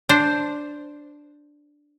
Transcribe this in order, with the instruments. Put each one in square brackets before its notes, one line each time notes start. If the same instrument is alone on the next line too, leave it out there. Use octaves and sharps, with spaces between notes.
[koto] D4 C5